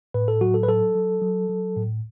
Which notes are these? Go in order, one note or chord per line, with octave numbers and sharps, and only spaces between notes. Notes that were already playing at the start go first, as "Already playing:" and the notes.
A2 B4
A4
F#3 F#4
A4
B4
F#3 A4
F#3
F#3
F#3
A2